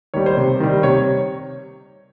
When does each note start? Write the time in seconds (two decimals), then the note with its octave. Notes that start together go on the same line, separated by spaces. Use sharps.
0.14 D#3 G3 C#5
0.26 C5
0.37 C3
0.60 D#3 G3
0.83 C3 C#5